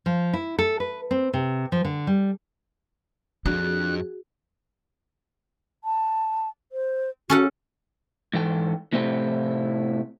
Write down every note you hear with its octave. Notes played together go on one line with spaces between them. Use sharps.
F3
E4
A4
B4
C4
C3
F3
D3
G3
B1 F2 D4 F#4 G#4 F#6
A5
C5
C#4 F#4 A4 F#5
G#2 E3 A4 G5
A2 C3 A3 C4 E4 G4